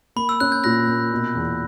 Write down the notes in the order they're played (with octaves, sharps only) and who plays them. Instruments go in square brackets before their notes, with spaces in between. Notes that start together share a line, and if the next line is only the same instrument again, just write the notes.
[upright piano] A#3 [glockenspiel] B5
[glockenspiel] E6
[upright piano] C#4 [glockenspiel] F#6
[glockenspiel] G6
[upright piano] A#2 [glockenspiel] F#6 A#6
[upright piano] A#3
B2
E2